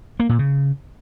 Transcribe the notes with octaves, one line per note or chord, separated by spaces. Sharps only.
A#3
A#2
C#3